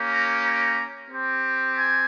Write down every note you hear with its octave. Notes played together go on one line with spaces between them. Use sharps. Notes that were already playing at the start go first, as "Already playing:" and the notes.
Already playing: A#3 C#4 G4
A#5
A#5
C4 G4
G#5